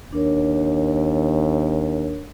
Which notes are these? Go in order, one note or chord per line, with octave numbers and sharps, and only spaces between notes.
D#2 D4 A#4 C#5